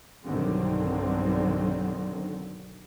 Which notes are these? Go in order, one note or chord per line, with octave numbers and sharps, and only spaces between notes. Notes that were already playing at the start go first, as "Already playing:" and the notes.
B1 G2 D3 D#3 F#3 C4